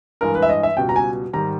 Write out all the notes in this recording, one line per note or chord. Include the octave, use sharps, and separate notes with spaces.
G2 E3 G#3 A#4
B4
E5
D#5
E5
C#2 B2 G3 G5
A#5
G#5
G#2 D#3 G3 A#5